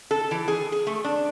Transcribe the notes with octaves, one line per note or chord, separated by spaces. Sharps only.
A4
E3
G#4
G#4
A3
D4